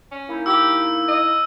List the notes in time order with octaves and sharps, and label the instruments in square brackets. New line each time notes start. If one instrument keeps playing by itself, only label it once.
[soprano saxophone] C#4
[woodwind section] A#3 D#4 E4
[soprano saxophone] G4 [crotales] E6
[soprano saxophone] D#5